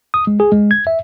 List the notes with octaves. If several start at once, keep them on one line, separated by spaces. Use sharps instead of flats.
D#6
G#3
G#4
G#3
G#6
E5